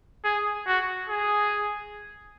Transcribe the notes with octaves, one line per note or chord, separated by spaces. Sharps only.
G#4
F#4
G#4